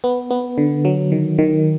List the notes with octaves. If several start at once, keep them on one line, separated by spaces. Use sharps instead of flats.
B3
B3
D3
F#3
D#3
D#3